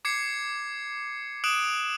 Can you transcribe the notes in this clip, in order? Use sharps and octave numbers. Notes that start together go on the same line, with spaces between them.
D6 G#6 C7 C#7
D#6 F#6 D7 E7 F#7